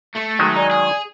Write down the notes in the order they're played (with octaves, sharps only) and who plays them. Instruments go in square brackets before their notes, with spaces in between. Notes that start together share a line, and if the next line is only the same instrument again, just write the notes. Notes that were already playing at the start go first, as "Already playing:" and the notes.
[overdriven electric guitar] A3
[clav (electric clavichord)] D#3 F#3 G#3
[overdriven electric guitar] D#4 [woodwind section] D5 G#5
[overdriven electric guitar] G#4